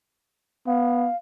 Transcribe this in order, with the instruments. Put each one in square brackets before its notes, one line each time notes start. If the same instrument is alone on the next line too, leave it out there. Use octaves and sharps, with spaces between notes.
[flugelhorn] B3 [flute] F5